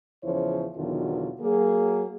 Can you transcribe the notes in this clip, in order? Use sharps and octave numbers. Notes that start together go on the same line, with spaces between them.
E2 C#3 F3 E4 C5 C#5
E2 B2 D3 D#3 F#3 F4
F#3 A#3 G#4